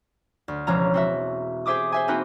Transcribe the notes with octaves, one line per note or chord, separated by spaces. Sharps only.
D2
E1 C#2 F3 C#4 A#5
C4 F#4 E5
G4 G#4 C5 E5 D6 D#6
C5 E5 G#5
A#3 C4 D#4 F#4 G4 B4